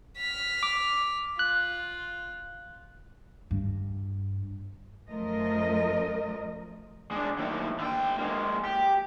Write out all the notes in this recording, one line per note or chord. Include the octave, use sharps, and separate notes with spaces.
F6 B6
D6
F4 F#6
G2
F#2 F3 A3 A#4 D#5
G#3 D4
D#2 A2
D3 G5
G#3 A#3
G4